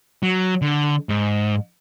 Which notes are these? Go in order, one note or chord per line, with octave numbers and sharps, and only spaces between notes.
F#3
D3
G#2